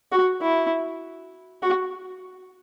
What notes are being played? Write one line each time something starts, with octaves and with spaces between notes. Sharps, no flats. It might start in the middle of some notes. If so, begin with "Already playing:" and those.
F#4
E4
F#4